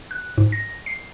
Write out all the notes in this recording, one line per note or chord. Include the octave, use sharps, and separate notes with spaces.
F#6
G#2
A#6
C7